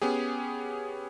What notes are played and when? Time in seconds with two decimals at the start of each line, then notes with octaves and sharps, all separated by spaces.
0.02 B3 C#4 G4 G#4